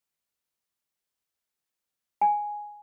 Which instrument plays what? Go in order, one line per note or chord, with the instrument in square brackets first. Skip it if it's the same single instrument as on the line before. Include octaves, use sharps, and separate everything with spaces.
[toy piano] G#5